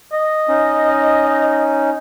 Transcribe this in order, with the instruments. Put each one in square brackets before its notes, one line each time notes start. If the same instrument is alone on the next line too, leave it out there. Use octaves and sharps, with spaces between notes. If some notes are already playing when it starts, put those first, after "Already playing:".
[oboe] D#5
[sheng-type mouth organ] C#4 D#4